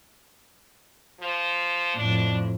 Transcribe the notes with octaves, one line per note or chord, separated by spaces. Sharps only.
F3
F2 A2 D4